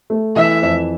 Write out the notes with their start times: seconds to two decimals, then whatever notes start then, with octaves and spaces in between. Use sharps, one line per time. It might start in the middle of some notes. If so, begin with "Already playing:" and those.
0.10 A3
0.36 E3 E5
0.62 F2